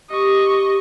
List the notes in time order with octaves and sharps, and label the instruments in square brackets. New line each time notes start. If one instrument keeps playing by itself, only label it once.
[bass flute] G4 [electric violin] D#5 C#6